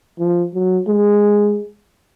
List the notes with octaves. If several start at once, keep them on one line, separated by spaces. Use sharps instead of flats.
F3
F#3
G#3